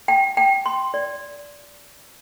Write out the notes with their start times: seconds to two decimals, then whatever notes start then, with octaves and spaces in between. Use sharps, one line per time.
0.08 G5
0.37 G5
0.66 C6
0.94 D5